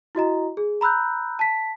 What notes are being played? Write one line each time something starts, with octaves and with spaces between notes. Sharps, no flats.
E4 F#4 D#5 A#5
G#4
A#5 B5 E6 F#6 G6
A5 B6